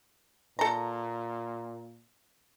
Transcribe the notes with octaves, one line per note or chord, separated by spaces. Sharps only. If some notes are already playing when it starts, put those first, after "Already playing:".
A#2 A4 A#5